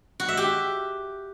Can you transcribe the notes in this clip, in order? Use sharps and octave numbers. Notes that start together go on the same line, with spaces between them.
F#4
E5
G4